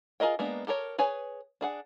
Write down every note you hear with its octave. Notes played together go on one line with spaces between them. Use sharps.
F4 G#4 A#4 D#5 G5
G#3 A#3 B3 D4
G4 A4 A#4 C#5
G#4 B4 C#5 G#5
D4 G#4 F#5